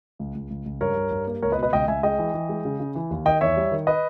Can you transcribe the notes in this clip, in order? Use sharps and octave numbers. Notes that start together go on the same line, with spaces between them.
C#2
C#2
C#2
C#2
G2 A#4 C#5
G2
G2
A#3
C#2 A#4 C#5
B4 D#5
B2
B4 D#5
C#2 D#5 G5
C#2 E5 G#5
G#3 D#5 G5
E3
E3
G#3
C#3
C#3
E3
D#2
D#3 D#5 G5
E2 C#5 E5
G3
D#3
B4 D#5